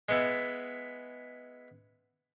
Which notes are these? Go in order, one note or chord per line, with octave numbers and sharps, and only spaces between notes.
G#3 B3 E4